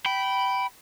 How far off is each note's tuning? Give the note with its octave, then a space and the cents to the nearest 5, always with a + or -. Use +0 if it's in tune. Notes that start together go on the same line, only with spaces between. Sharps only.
G5 -20 B5 +0